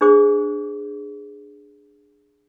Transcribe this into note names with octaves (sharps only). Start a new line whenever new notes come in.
D4 G#4 C5 D6